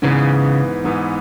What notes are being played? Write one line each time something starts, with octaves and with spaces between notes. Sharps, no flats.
G#2 C#3 E3 B3
G#2 E3 B3